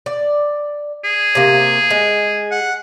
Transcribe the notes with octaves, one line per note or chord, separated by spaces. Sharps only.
D5
G#4
C3 A#3
G#3
F#5